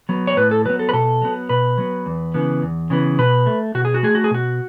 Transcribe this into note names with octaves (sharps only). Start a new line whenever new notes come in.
F#3 B3
C#5
A2 B4
A4
F#3 B3 B4
A4
B4
B2 A4
F#3 B3
B2 B4
F#3 B3
E2
C#3 E3 B3
E2
C#3 E3 B3
B2 B4
A3
B2 F#4
G#4
F#4
A3 G#4
F#4
G#4
B2 F#4